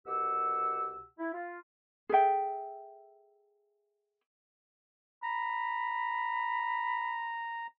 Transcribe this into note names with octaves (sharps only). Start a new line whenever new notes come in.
C2 B2 G4 F#5 E6
E4
F4
G#4 A4 E5 G5
A#5 B5